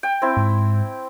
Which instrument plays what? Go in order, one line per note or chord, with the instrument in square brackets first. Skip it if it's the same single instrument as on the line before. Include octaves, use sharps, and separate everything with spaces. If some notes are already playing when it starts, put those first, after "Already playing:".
[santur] G5
C4 E4
[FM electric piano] G#2